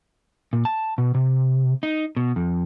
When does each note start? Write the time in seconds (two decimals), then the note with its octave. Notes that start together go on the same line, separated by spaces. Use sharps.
0.53 A#2
0.65 A5
0.98 B2
1.15 C3
1.83 D#4
2.16 B2
2.36 F2